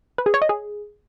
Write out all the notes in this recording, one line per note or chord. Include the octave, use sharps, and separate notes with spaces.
B4
G#4
C#5
D#5
G#4